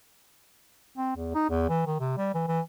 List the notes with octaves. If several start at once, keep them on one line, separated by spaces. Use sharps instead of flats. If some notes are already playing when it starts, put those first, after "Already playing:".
C4
E2
D#4
E2
E3
D#3
C3
G3
E3
E3